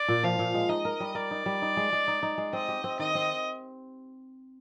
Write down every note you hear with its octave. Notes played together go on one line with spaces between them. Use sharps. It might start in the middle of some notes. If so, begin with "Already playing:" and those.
Already playing: D5
A#2
F3 F5
A#2
G#3
D#4 D#5
A#4
G3
A#4 D5
D#4
G3
D#4
G#3
G#3
D#4
D#4
G#3
C4 D#5
G4
C4
D#3 D#5
C4